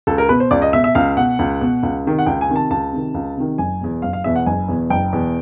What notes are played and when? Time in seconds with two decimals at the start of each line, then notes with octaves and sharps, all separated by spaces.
0.07 C#2 A4
0.18 A#4
0.29 B2 B4
0.40 C5
0.51 C#2 D5
0.62 D#5
0.73 B2 E5
0.84 E5
0.95 C#2 F5
1.17 B2 F#5
1.39 C#2
1.61 B2
1.83 C#2
2.05 C3 D#3
2.19 F#5
2.26 C#2 G5
2.41 G#5
2.49 C3 D#3
2.56 A5
2.70 C#2 A5
2.92 C3 D#3
3.14 C#2
3.37 C3 D#3
3.58 F#1 G#5
3.81 E2 B2
4.02 F#1 F5
4.13 F5
4.24 E2 B2 E5
4.36 F#5
4.46 F#1 G#5
4.68 E2 B2
4.90 F#1 G5
5.13 E2 B2